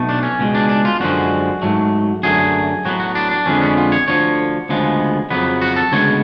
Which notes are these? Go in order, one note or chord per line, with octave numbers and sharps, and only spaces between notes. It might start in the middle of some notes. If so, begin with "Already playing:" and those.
Already playing: B1 B2 A3
D4
C#4
C#2 B2 G#3
D4
D4
F4
F#2 D3 F3 G#3 F#4
G#2 F#3 A3
F#2 D3 F#3 A3 G#4
A2 F#3 B3 F#4
F#4
D4
D4
F2 D3 G#3 B3 C#4
C#4
F4
C#5
D2 D3 F3 C#5
D2 C#3 F3 G#3 B3
F2 C#3 F#3 B3 B4
F#4
A4
D2 C#3 G#3 B3 C#5